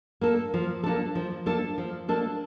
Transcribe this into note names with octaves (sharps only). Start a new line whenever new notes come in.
A#3 D4 A4
F3
A#3 D4 A4
F3
A#3 D4 A4
F3
A#3 D4 A4